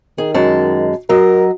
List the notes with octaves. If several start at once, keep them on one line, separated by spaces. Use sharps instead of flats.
D#3 G#4
F#2 G#3 A5
F#3 A#4 D#5